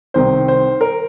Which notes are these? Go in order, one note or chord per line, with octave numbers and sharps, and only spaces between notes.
C2 C3 D#3 C5
C5
A#4